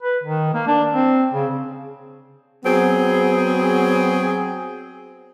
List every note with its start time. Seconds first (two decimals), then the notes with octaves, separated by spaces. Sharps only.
0.02 B4
0.24 D#3
0.54 A#3
0.67 D4
0.92 C4
1.33 C#3
2.64 F#3 B3 C4 G#4